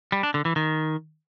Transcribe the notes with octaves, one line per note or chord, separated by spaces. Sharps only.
G3
D4
D3
E3
D#3